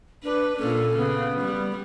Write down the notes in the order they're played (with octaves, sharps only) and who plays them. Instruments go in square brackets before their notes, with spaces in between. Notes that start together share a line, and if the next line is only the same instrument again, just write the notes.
[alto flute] D4 [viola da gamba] B4
[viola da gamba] A#2 C#4 [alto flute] A4
[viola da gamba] C#3 [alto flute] B3
[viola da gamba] G3